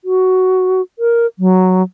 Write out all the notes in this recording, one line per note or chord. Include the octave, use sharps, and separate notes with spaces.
F#4
A#4
F#3